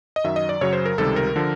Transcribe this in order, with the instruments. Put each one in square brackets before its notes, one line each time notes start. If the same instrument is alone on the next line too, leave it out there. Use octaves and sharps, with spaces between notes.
[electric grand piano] D#5
F#2 D#3 F#3 E5
D#5
D5
F#2 C#3 F#3 C#5
C5
A#4
C#2 C3 D#3 G3 A4
A#4
D3 F3